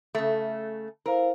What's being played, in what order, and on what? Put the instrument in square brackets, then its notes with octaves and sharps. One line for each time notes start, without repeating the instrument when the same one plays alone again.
[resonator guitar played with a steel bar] C#3 A3
[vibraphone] E4 C5 F5 [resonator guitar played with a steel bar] A#4